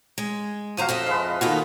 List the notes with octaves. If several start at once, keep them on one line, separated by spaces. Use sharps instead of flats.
G#3
D#2 F3 F#4 C5 F5 A#5 D#7
F2 D#5 E5
F3 G#3 B4 F5
D#3 A#3 D#4 F4 F#4 A4